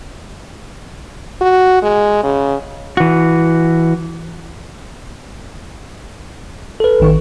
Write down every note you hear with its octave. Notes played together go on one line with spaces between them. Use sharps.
F#4
G#3
C#3
E3 F#4
A4 B4
A1 D#3 C#6